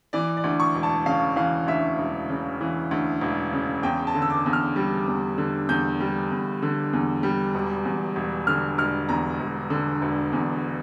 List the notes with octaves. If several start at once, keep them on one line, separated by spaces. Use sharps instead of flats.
E3 D5
D5
D2
C#6
E1
A5
C#3 F5
E3 F5
D2 E5
E1
C#3
E3
D2
E1
C#3
E2 G5
A5
D3
E6
D6
E2
F6
G3
E2
D3
E2 G6
G3
E2
D3
E2
G3
E1
E2
E1
D3 F6
E1 F6
E2 A#5
E1
D3
E1
E2